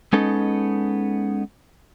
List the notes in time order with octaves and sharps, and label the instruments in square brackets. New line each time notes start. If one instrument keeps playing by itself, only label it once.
[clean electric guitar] G#3 B3 C#4 D#4 A4